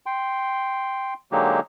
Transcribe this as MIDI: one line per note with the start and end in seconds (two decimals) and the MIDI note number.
0.06 1.14 79
0.06 1.14 84
1.32 1.60 50
1.32 1.60 54
1.32 1.60 56
1.32 1.60 58
1.32 1.60 63
1.32 1.60 67